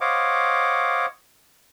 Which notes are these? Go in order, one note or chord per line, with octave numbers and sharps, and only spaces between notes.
C5 C#5 D#5 F5 F#5 D6